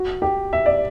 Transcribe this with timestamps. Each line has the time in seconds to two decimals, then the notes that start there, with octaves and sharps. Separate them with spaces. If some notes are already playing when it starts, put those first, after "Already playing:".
Already playing: F#4
0.22 G4
0.53 E5
0.66 D5